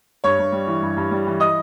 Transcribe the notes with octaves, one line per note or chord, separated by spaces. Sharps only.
G2 C#5 C#6
G2
G3
E3
G2
G2
G3
E3
D#5 D#6